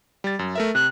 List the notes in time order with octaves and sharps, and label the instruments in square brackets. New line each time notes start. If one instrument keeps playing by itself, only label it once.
[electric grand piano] G3 A6
F#2
A3 A#4 E5
[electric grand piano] C3 [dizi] F#6